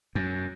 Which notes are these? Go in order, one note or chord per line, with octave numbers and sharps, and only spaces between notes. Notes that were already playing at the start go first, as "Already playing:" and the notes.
F#2